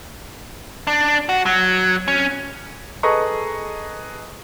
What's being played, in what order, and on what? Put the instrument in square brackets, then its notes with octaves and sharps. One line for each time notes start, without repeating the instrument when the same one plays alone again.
[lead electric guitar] D4
F#4
F#3
C#4
[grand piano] G#4 A4 B4 D#5 A#5 C#6